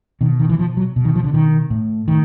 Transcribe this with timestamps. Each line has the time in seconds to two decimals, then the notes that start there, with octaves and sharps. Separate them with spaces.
0.21 B2 D#3
0.39 D#3
0.49 E3
0.58 B2 F3
0.77 F#3
0.96 B2
1.05 D#3
1.15 F3
1.24 D3
1.33 B2 D#3
1.70 A2
2.08 A2 D#3